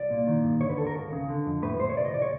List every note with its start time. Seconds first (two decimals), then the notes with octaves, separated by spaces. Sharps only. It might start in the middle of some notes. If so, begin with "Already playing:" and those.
Already playing: C2 D5
0.10 A#2
0.27 D#3
0.44 G2
0.61 D3 C#5
0.70 B4
0.78 D#2 A4
0.87 A#4
0.95 C#2
1.12 C#3
1.29 D3
1.47 F2
1.62 A2 B4
1.80 A2 C5
1.90 C#5
1.97 C3 D5
2.05 D#5
2.14 C#2 D5
2.22 C#5